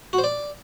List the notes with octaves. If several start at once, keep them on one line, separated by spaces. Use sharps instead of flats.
F#4
C5
D5